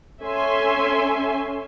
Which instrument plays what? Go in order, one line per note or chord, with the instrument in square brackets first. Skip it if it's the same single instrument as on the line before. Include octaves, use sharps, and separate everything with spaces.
[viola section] C#4 A4 E5 G#5 C6